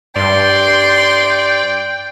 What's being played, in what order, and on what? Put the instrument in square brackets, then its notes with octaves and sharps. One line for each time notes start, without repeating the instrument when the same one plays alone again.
[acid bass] G2 [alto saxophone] D5 [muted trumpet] G5 [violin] C6